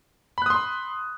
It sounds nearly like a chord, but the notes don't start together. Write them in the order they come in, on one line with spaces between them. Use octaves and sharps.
B5 F#6 D#6 C6